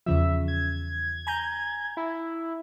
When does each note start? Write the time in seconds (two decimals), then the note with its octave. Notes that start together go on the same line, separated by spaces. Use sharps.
0.06 E2 C#3 F3 E5
0.48 G#6
1.27 G#5 A#5 G6
1.97 E4